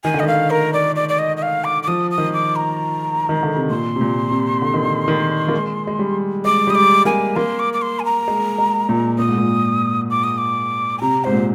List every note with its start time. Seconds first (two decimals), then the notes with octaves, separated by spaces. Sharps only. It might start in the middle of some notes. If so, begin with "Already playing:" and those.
0.04 D#3 G#5
0.14 D3
0.20 D#5
0.23 D#3 F5
0.50 A#4
0.73 D5
0.96 D5
1.09 D5
1.19 D#5
1.37 D#5
1.42 F5
1.64 D6
1.83 D6
1.88 F3 D#6
2.11 D#6
2.18 D#3
2.33 D6
2.56 A#5
3.29 D#3
3.43 D3
3.56 C3
3.70 A#2 C6
3.96 C3
4.01 A#2
4.31 C3
4.62 D3
4.74 D#3
4.85 D3
5.08 D#3
5.48 A#3
5.53 G#3
5.87 G#3
5.99 G3
6.45 G#3 D6
6.67 G3 D#6
6.75 G#3 D6
7.05 A#3 G#5
7.36 A#3 C6
7.59 D6
7.73 D6
7.82 C6
8.00 G#5
8.05 A#5
8.28 G#3
8.58 G#3
8.89 A#2
9.19 A#2 D#6
9.28 G#2
9.38 A#2
10.10 D6
10.24 D#6
10.38 D6
10.98 G#5
11.01 C3 A#5
11.24 G#2 C5
11.33 A#2